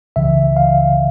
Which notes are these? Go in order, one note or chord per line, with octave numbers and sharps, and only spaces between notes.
C#2 C#3 E3 E5
F5